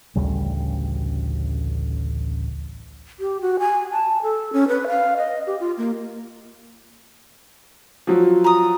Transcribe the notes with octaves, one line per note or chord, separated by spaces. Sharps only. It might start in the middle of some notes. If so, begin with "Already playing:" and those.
A1 D2 C#3 G3
G4
F#4
G#5
A5
A4
C#4
B4
F5
D#5
G4
F4
A#3
F3 F#3
A#5 D#6